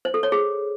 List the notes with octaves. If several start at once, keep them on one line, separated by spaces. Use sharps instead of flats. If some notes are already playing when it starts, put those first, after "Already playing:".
C5
A4
C#5
G#4